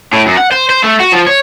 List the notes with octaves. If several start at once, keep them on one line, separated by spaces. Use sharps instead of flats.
A2
F#2
F#5
C5
C5
A3
F#4
F3
C#5